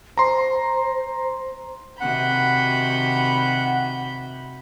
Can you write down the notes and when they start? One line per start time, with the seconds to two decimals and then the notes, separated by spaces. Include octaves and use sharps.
0.18 C5 A#5 C6
2.00 C3 D#3 F#4 F#5 B5 G6